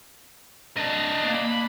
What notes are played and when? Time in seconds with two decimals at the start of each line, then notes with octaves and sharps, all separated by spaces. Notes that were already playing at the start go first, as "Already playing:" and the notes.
0.77 D4 D#5
1.23 A#3
1.35 B5